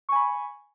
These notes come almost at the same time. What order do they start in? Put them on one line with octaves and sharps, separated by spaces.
C#6 G#5 B5